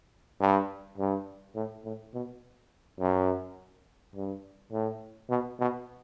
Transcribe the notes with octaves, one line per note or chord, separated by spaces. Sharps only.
G2
G2
A2
A2
B2
F#2
G2
A2
B2
B2